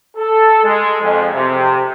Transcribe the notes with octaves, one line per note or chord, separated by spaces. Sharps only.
A4
G#3
F2
C3